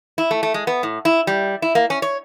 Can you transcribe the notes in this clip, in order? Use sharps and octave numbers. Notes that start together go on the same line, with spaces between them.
E4
A3
A3
G#3
B3
A2
E4
G3
E4
A#3
C#4
C#5